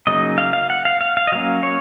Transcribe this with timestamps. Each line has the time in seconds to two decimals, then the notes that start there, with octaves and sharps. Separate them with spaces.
0.07 C#3 F#3 A#3 D#4 D#5
0.38 F5
0.53 F5
0.70 F#5
0.85 F5
1.01 F5
1.17 F5
1.27 D#5
1.32 F#3 A#3 C#4 F5
1.63 C#5